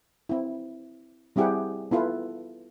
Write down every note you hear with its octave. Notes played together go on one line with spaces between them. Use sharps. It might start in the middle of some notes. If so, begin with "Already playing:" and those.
C4 E4
G3 C4 E4 G4 G#4 F#5
B3 E4 F4 A4 B4